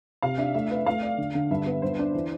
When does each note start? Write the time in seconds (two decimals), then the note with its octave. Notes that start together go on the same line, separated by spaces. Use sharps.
0.22 C3 F5
0.38 D4 E5
0.54 A3 E5
0.71 B4
0.86 A3 F5
1.03 D5
1.18 D3
1.35 D3
1.51 G2 E5
1.66 B3
1.82 G2 C5
1.99 D4
2.15 E3